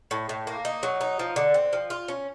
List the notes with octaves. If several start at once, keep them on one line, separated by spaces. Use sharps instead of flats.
A2
A2
A#3
D#4
F#3
D#4
F3
D3
C4
F3
F4
C#4